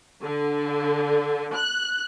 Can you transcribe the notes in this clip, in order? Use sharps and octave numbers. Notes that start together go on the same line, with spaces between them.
D3
F#6